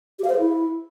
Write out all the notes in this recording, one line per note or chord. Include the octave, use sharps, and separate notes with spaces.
G4
F5
C5
G#4
E4